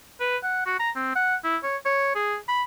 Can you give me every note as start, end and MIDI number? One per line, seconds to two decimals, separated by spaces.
0.20 0.37 71
0.43 0.65 78
0.66 0.79 66
0.80 0.90 82
0.95 1.12 60
1.15 1.35 78
1.44 1.57 64
1.63 1.77 73
1.85 2.12 73
2.15 2.36 68
2.48 2.63 83